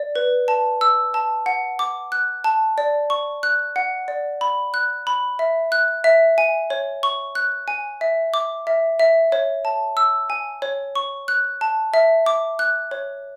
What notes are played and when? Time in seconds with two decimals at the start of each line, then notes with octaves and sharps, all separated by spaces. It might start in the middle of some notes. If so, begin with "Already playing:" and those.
Already playing: D5
0.16 B4
0.48 A5
0.81 E6
1.14 A5
1.46 F#5
1.79 D6
2.12 F#6
2.44 A5
2.78 D5
3.10 C#6
3.43 F#6
3.76 F#5
4.08 D5
4.41 B5
4.74 F#6
5.07 B5
5.39 E5
5.72 F#6
6.04 E5
6.38 G#5
6.70 C#5
7.03 C#6
7.35 F#6
7.68 G#5
8.01 E5
8.34 D6
8.67 E5
9.00 E5
9.32 C#5
9.65 A5
9.97 E6
10.30 G#5
10.62 C#5
10.96 C#6
11.28 F#6
11.61 A5
11.94 E5
12.26 D6
12.59 F#6
12.91 C#5